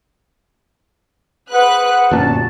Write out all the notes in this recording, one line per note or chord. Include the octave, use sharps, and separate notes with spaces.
G#4 B4 C5 F#5 F#6
G1 F#2 A#2 A5